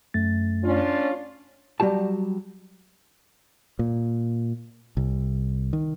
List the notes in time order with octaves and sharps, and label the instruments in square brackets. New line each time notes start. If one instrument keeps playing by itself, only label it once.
[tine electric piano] F#2 A3 A6
[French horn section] C#4 D4 F4
[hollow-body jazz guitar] F#3 G3 F#4 G4 A5
[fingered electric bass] A#2
C2
D#3